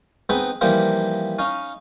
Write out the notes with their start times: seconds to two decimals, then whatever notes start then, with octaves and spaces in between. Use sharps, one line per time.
0.29 B3 C4 D#4 G#4 B4
0.61 E3 F3 G3 A#3 D#4 C5
1.39 C#4 D#4 F5